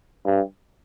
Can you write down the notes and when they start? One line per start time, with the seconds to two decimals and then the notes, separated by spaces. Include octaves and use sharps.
0.26 G2